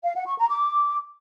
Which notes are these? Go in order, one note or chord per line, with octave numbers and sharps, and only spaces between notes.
F5
F#5
C#6
A#5
D6